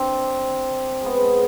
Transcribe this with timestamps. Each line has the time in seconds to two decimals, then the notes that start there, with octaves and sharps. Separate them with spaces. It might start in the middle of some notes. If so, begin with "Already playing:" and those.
Already playing: C4 D4
1.01 G#3 B3
1.24 G#3